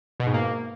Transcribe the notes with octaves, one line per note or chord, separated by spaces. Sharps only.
B2
G#2
A#3